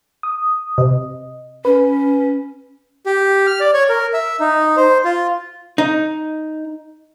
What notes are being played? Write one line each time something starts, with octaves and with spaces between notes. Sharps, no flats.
D#6
C3 D#5
C#4 B4
G4
F6
D5
C#5
A#4
E5
D#4
C5
F4
D#4